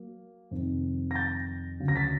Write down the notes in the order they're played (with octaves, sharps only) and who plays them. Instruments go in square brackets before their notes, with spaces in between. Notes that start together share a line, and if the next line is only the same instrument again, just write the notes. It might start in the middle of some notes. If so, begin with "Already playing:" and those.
Already playing: [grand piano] F#3 A#3
F2 C3 D#3
A#6
G6 A6
D2 C#3 F#3
A#6
A6 B6